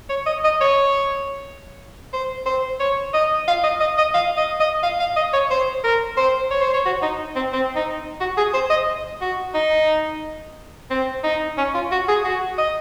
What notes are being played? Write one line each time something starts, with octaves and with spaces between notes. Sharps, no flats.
C#5
D#5
D#5
C#5
C5
C5
C#5
D#5
F5
D#5
D#5
D#5
F5
D#5
D#5
F5
F5
D#5
C#5
C5
A#4
C5
C#5
C5
C#5
F#4
D#4
C4
C4
D#4
F#4
G#4
C5
D#5
F#4
D#4
C4
D#4
C#4
F4
F#4
G#4
F#4
D#5